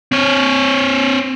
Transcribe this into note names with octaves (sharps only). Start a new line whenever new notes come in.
C4 C#5